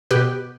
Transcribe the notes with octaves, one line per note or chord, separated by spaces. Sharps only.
B2 G4 B4